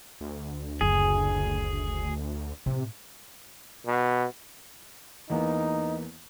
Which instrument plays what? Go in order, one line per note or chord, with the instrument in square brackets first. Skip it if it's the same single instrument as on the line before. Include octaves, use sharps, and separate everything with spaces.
[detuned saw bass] D2
[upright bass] F#1 [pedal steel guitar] G#4
[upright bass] A2 [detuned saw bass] C3
[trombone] B2
[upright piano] E2 A#3 B3 [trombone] D#4